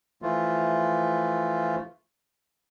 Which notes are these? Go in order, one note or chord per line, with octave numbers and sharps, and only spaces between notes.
E3 F3 A3 F4